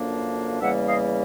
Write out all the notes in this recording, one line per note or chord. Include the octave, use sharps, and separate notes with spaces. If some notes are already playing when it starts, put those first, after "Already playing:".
Already playing: F#2 D3 F3 A#3 D4
E2 C#3 E3 G3 A#3 E5 F#5
D#5 F5